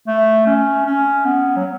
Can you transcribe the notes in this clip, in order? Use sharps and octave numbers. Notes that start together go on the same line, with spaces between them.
A3
C#4
C#4
B3
F#3